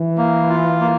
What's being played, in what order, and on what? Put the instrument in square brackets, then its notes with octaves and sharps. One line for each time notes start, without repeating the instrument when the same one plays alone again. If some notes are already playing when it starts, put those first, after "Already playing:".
Already playing: [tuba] E3
[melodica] A#3
F4
A#3